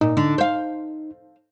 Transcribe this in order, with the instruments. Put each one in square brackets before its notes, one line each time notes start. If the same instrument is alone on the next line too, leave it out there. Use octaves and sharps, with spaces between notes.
[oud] A#2 [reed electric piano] D#4
[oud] D3
C5 F5